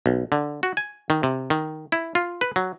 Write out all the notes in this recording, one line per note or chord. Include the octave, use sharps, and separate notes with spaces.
B1
D3
F#4
G#5
D#3
C3
D#3
E4
F4
B4
F#3